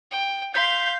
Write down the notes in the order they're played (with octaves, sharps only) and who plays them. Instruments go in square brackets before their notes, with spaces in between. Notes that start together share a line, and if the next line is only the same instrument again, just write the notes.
[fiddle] G5
[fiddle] F5 C6 [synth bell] G6 B6 C7